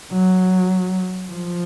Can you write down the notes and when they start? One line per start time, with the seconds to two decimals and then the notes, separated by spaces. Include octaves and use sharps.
0.12 F#3
1.32 F3